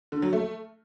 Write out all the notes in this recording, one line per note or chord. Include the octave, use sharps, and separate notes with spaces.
D3
F#3
A3